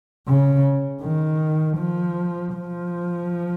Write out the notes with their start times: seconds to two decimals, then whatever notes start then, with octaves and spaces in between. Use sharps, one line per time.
0.27 C#3
1.02 D#3
1.78 F3
2.54 F3